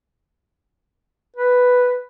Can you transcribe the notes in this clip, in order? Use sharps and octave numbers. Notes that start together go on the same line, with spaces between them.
B4